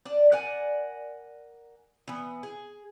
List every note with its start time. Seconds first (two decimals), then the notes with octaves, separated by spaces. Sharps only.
0.05 D4 D5
0.32 A#4 D5 F#5 G#5
2.08 E3 B3
2.43 G#4